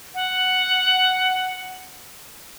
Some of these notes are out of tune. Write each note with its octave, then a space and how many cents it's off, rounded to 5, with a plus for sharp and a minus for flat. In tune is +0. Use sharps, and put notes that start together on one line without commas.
F#5 +5